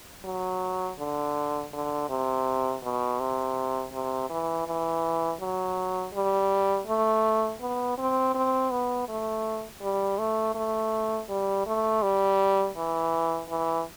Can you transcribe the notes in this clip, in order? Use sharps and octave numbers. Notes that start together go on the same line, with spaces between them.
F#3
D3
D3
C3
B2
C3
C3
E3
E3
F#3
G3
A3
B3
C4
C4
B3
A3
G3
A3
A3
G3
A3
G3
E3
E3